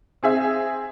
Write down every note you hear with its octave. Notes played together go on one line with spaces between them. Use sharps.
C4 G#4 E5